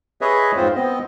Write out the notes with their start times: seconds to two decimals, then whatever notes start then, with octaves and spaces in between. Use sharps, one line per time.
0.21 G#4 B4 C#5 D#5 E5
0.56 F2 G#2 C4 F4 C5
0.75 B3 C4 D#5